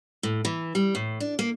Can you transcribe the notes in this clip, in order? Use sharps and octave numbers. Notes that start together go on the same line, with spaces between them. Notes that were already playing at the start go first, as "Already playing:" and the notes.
A2
E3
G3
A2
D4
A#3